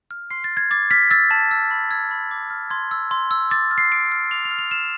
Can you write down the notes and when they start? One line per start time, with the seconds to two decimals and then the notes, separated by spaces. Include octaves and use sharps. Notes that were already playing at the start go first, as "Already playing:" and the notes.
0.11 F6
0.31 C6 C7
0.44 A6
0.51 F6
0.57 G#6
0.71 D6 A6
0.91 F6 B6
1.10 E6 A6
1.31 A5
1.51 E6
1.71 B5
1.91 E6 G#6
2.11 B5
2.31 D6
2.50 F6
2.70 C6 G#6
2.91 E6
3.11 C6
3.31 E6
3.51 D6 A6
3.71 F6
3.78 C7
3.92 D6 D7
4.12 F6
4.31 D6 F7
4.45 F7
4.51 F6
4.59 F7
4.71 F6 E7